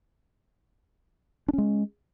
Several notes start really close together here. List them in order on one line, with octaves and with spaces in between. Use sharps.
D4 C#4 G#3